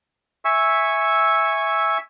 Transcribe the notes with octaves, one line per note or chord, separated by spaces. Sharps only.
E5 G#5 C#6 E6